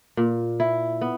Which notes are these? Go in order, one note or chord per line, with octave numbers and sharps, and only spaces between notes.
A#2
E4
B3